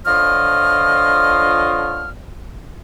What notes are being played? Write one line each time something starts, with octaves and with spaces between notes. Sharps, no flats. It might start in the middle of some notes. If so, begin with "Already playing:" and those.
D3 F3 F4 C#5 D#5 F6